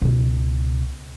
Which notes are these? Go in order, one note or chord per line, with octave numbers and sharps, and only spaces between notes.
C#2 B2